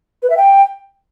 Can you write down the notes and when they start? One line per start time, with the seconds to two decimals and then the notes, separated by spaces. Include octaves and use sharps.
0.23 B4
0.30 E5
0.37 G5